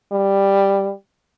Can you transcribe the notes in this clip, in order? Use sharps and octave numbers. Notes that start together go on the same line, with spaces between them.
G3